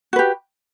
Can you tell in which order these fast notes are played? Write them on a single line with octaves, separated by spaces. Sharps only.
F#4 B4 G4